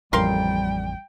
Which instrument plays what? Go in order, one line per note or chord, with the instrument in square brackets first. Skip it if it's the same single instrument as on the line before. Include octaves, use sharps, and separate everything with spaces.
[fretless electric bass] A1 F2 [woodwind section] G3 [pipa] A#4 F5 C6 [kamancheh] G5